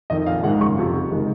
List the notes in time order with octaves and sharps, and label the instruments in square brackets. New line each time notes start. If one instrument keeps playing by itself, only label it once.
[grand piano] F2 D#3 D#5
A#1 F5
G#2 D#3 G#3 F#5
F#1 C#6
F2 C3 F3
F#1
D#3 G#3